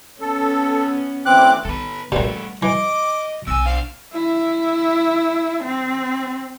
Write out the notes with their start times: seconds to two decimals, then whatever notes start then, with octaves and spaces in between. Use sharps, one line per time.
0.21 B3 C#4 A4
1.26 D2 E3 C4 D6 F#6
1.65 D#3 B3 A4 B4
2.12 A#1 G2 G3 A3 B3 D4
2.63 E3 D#5 D6
3.47 B1 E2 G#5 E6
3.65 D4 C5 F5
4.13 E4
5.63 C4